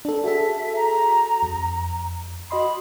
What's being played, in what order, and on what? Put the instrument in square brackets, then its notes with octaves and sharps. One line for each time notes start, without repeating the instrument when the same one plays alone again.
[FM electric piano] D4 A4
[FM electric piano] F#4 G#4 A4 [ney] E5
[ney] A#5
[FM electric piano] F2
[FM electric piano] F#4 D#5 C6 [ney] B5